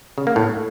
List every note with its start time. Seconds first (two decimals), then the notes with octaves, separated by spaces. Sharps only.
0.18 C#3
0.27 A#3
0.36 A2